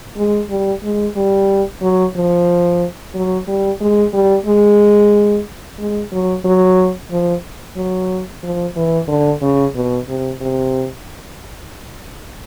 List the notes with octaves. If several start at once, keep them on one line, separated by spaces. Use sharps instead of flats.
G#3
G3
G#3
G3
F#3
F3
F#3
G3
G#3
G3
G#3
G#3
F#3
F#3
F3
F#3
F3
E3
D3
C#3
B2
C3
C3